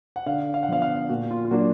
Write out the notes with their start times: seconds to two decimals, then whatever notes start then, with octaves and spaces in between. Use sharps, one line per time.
0.16 F#5
0.26 D3 F5
0.54 F5
0.63 F#5
0.68 F3 B3 F5
0.82 F5
1.09 A#2 F#4
1.31 F4
1.45 F4
1.51 F#3 A#3 D4 F#4